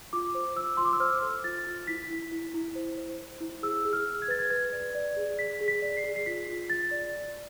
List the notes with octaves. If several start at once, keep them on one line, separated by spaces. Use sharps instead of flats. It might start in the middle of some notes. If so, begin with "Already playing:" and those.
F4 D6
C5
F4 E6
F4 C6
D6
E6
C5 F6
A4
F4 A6
F4
E4 B6
E4
E4
E4
C5
C5
C5
E4
G#4 E6
G#4
F6
G#4
G#6
B4 A6
G#6
B4 G#6
D5
D5
G#4
G#4 B6
G#4
B6
D5
C7
G#4
C7
F4 B6
F4
F4 A6
D5